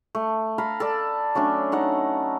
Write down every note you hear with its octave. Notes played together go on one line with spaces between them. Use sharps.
A3
A4 F5 A#5 B5
A4 D5
F#3 A3 C#4 D4
D#4 C#5 F#5